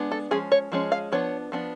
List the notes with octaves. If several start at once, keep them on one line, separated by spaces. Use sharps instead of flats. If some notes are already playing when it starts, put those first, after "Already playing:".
Already playing: G#3 B3 D4
A4
F3 G#3 C#4 G#4
C#5
F3 G#3 C#4
F5
F3 B3 D4 C#5
F3 B3 D4